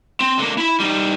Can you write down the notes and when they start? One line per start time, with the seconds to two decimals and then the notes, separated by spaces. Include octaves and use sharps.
0.21 C4
0.38 D3 A#3
0.58 E4 B5
0.80 G3 D#4